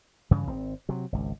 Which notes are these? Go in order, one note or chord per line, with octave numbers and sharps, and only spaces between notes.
G2 C#3 E3
G#1 C4
C3 F#3
G#1 C#2